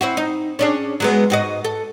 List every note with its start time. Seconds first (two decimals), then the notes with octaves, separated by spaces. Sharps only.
0.01 C4 E4 F#4
0.17 D#4
0.59 C#4 D4 G#4
1.00 F#3 G#3 B3
1.30 G#2 F#4 D#5
1.65 A4